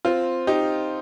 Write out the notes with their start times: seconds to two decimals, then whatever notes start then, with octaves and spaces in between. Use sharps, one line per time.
0.05 C4 F4
0.47 D#4 G4